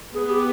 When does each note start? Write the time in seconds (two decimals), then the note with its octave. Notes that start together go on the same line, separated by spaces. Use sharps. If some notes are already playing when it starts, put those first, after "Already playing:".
0.14 B3 G#4
0.30 G4